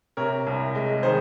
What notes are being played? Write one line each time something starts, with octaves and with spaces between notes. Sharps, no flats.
C3 A#4 C#5
C2
G#3
D#3 G#4 C5